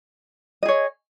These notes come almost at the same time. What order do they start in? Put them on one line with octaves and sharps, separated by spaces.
D#5 G#4 C#5